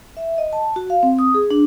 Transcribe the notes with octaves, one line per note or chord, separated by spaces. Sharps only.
E5
D#5
A5
F#4
F5
C4
D#6
G#4
D4